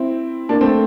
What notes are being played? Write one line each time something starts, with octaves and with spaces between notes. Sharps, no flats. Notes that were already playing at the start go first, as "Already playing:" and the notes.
Already playing: C4 E4
A#3 D4
A3 C4